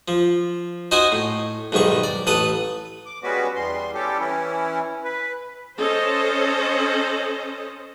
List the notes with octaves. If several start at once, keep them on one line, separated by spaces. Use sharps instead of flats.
F3
D#4 F#4 C5 D#5 G#5 C6
A2
B1 G#2 D#3 G3 C#6
D5
A1 A4 B4 B5 D#6
D6
G3 G#3 B3 C#4 F#4 B4
E2 G3 C6
G3 C#4 G4 A4
E3 C#4 E4
B4
C#4 A4 C5 D#5